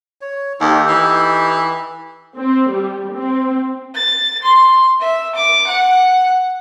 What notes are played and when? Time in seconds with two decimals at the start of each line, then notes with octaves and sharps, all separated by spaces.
0.21 C#5
0.60 D#2 D#4 G4 A4
0.88 E3
2.36 C4
2.71 G3
3.14 C4
3.94 A6
4.43 C6
5.00 E5
5.35 D6
5.67 F#5